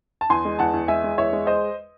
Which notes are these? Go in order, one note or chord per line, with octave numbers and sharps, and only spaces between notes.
A5
E2 G#5 C6
G#3
E2 F#5 A5
E2
G#3 E5 G#5
G#3
E2 C#5 E5
G#3
C5 D#5